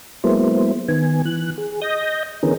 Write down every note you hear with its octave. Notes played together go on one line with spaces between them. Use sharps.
F#3 G#3 A#3 B3 E4 C5
D#3 B3 G#5
E3 F#6
G#4
D#5 D#6 G6 A#6
D3 E3 B3 C#4 G#4 A#4